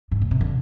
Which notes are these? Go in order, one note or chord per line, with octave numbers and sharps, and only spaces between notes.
G#2
A#2
C3
D3